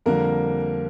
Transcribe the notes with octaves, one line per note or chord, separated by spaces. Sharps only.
F2 D3 G3 A#3 A#4